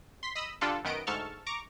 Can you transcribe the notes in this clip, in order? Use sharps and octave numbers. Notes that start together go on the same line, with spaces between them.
C6 B6
D#5 B5 D#6 E6
D3 G3 D4 F4 A4
F#2 D#3 B3 D#5 D7
D2 G#2 A4 A5 C#6 F6
A#5 C#6 D6